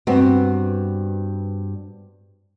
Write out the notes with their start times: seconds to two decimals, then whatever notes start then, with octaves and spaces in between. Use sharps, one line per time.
0.07 G2 B3 C4 F#4